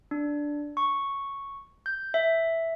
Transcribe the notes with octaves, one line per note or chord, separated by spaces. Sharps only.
D4
C#6
G6
E5